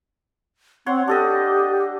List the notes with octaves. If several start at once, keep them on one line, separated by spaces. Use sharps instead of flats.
C4 C#5 F#5 C6
D4 G4 A4 D#5